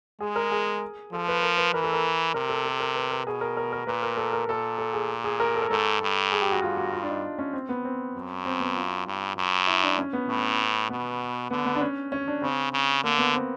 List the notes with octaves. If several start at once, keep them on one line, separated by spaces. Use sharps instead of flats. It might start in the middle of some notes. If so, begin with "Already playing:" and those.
G#3 G#4
A#4
G#4
F3 A4
B4
A#4
B4
E3 A#4
A4
A#4
C3 A#4
A4
A4
A#4
B4
A#4
B2 G#4
A#4
A#4
A#4
A#2 B4
A#4
A4
A#4
A#2 A4
A4
G#4
G#4
A#4
A4
A#4
G#2 A4
G2
G#4
G4
F#4
G2 F4
F#4
F4
D4
D#4
C#4
C4
B3
C4
F#2
C4
B3
F4
G2
F#2
E4
D4
C#4
B3
A2
B2 B3
D3 B3
B3
D4
C#4
C#4
D4
C#3 C4
C#3
D3 A#3
B3
C4